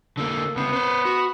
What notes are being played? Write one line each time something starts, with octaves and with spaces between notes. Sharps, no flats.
D3 A#3 A4
C#2 B3 C4
B4 C5
F#4